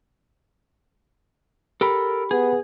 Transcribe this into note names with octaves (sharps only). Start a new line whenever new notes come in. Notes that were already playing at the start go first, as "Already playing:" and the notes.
G4 A4 A#4 B5
B3 G#4